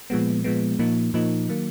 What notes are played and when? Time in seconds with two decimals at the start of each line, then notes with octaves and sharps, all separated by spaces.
0.10 A#2 F3 G#3 B3
0.44 A#2 F3 G#3 B3
0.79 A#2 F3 A#3 D#4
1.14 A#2 F3 A#3 D#4
1.49 D#3 F#3 A#3